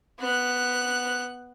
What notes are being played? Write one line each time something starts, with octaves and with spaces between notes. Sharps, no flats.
B3 F#6